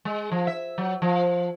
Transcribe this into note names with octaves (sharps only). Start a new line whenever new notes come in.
G#3
F3
E5
F#3
F3